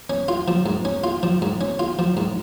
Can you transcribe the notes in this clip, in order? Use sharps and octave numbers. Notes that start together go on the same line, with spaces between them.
C#4
F4
F3
G#2
C#4
F4
F3
G#2
C#4
F4
F3
G#2